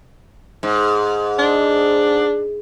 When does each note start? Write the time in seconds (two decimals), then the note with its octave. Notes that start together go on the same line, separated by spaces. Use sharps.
0.63 G#2
1.39 D4